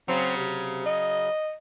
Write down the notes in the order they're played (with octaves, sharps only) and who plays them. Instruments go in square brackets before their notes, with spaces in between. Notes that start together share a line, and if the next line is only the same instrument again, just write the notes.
[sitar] C#3 F#3 [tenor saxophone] C4
[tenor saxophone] C3
D#5